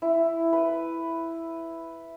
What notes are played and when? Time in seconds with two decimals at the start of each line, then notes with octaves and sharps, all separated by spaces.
0.02 E4
0.53 B4